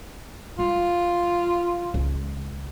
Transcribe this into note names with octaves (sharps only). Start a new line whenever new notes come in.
G3 F4
C#2